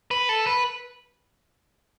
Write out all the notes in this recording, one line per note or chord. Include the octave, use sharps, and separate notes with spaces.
B4
A4
B4